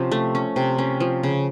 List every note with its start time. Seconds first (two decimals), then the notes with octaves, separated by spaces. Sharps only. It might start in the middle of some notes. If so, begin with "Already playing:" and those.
Already playing: C3 F3 C#4
0.12 A3
0.35 C#4
0.56 C3
0.78 C#4
1.00 F3
1.23 C#3